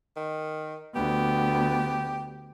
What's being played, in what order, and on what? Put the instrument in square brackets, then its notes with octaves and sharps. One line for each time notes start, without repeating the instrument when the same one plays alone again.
[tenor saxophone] D#3
[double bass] D2 B3 [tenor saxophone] G4